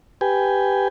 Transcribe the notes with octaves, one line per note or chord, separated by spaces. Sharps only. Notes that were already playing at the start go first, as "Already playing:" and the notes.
G4 B4 G5 G#5